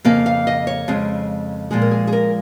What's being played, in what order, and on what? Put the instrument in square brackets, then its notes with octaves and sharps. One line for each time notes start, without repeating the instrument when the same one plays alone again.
[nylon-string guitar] F2 C#3 A#3 F5
F5
D#5
C#5
F2 C#3 G#3
A#2 F3 G#3 G#4
A#4
G#4
G#4
A#4